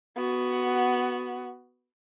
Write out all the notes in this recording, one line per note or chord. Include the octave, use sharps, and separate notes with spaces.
B3 F#4